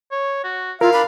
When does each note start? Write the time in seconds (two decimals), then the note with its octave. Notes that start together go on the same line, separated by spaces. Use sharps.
0.11 C#5
0.44 F#4
0.81 E4 F4 A#4 F5
0.93 D4 B5